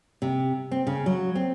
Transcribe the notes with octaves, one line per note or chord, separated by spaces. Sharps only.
C3
C4
C#3
F#3
C4